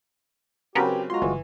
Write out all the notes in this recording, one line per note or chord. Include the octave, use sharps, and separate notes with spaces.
C#3 F#3 B3 C4 G4 A#4 B4
G#3 F4 F#4 A#5 C6
G1 E3